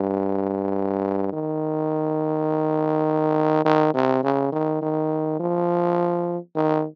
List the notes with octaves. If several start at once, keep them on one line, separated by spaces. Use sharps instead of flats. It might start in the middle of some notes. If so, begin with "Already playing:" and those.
Already playing: G2
D#3
D#3
C3
C#3
D#3
D#3
F3
D#3